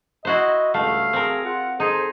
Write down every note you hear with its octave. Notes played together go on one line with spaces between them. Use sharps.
E4 F#4 C5 D#5
C#2 G2 A3 F5
C4 G#4 A#4
F4 F#5
D#4 G#4 A4 C5